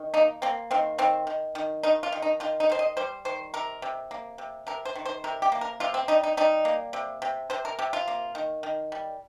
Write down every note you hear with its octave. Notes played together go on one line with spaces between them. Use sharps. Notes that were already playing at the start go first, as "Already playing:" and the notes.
Already playing: D#3
A#3 D#4
A#3 C4
D#3 C4
D#3 C4
D#3
D#3
D#3 D#4
F4
D#3
D#4
D#3 F4
D#4
D#3 C5
D#5
G3 C5
D#3 C5
C3 A#4
C3
A#3
C3
C3 A#4
C5
D#3
C5
C3 A#4
G4
A#3
A#4
C3 F4
C4
G3 D#4
D#4
G3 D#4
A#3
C3
C3
C3 C5
A#4
C3 G4
F4
A#3
D#3
D#3
G3